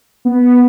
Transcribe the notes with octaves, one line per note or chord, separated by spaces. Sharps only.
B3